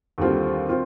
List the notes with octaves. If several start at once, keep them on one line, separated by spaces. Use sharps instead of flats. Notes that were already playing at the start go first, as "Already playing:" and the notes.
D#2 D3 G3 C4 F4
C4 F4